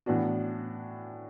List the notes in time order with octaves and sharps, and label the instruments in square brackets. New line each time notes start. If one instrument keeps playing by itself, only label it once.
[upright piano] A2 E3 B3 D4 F#4